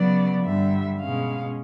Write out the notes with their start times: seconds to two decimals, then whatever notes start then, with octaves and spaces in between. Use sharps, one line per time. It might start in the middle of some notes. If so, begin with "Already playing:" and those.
Already playing: C#3 F#3 B3 D5
0.44 G2 D3 G3 E5
0.99 B2 G#3 C#4 F5